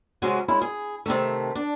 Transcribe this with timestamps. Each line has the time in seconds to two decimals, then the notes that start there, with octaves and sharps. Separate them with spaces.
0.22 C3 F#3 G#3 C#4 F#4
0.48 G#3 C#4 E4
0.62 G#4
1.06 C3 D#3 A3
1.55 D4